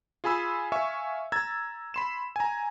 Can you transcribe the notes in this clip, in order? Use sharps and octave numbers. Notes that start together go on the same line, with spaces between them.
F4 G#4 G#5 B5 E6
E5 F5 G#5 C#6
A#5 E6 G#6 A6
B5 C6 E7
G#5 A#5